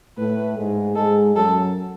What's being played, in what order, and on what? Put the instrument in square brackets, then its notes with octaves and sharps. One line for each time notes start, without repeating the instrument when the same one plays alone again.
[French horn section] A2 A3 [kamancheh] B4
[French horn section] G#2 G#3
[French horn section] G#2 G#3 [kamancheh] A4
[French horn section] F#2 F#3 [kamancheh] A4